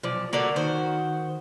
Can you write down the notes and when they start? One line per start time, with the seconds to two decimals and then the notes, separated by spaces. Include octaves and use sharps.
0.03 B1 F3 D5
0.33 D3 A#3 F#4 A#4 D5
0.56 D#3 F#4 C5